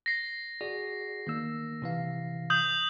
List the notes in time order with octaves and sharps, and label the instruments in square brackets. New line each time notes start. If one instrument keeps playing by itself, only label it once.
[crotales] A#6 C7
[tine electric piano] F#4 G#4 D5
D#3 A#3 E6
C3 E3 F5
[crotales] D#6 G6 F#7